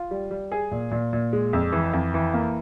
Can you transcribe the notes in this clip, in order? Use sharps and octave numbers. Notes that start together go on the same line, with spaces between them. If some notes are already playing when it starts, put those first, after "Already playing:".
Already playing: F4
G3
G3
G#4
A#2
A#2
A#2
G#3
F2
E3
F2
E3
A#3